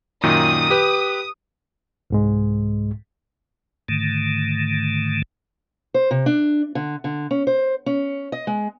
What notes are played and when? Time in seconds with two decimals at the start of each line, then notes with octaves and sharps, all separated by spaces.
0.23 F#2 A#2 D#3 D#6
0.70 G4 B4
2.10 C2 G#2 G#3
3.88 G#2 D3 D#3 A3
5.94 C5
6.11 C3
6.26 D4
6.75 D3
7.04 D3
7.31 C#4
7.47 C5
7.86 C#4
8.32 D#5
8.47 G#3